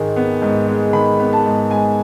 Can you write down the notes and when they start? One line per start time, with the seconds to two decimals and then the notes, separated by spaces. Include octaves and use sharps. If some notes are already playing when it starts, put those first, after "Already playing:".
Already playing: G#2 D#3 G#3
0.16 B3
0.42 G#2
0.68 G#3
0.93 D#3 B5
1.20 B3
1.33 A5
1.46 G#2
1.71 G#3 G#5